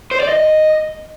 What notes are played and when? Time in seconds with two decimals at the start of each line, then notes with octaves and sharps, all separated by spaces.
0.11 C5
0.20 D5
0.29 D#5